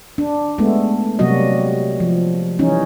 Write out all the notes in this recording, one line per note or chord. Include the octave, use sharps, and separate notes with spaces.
D4
G#3 A3 B3
C3 F#3 G3 A#3 F#4 D#5
F3
E3 G3 C#4 D#4